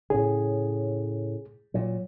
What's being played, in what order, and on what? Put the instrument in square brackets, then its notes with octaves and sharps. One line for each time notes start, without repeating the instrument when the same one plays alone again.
[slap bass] A2 C#3 [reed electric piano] G#4
[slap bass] A#2 F#3